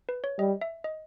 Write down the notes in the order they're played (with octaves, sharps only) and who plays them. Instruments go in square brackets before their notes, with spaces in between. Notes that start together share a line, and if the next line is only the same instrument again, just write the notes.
[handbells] B4
C#5
[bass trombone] G3 [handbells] D#5
[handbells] E5
D#5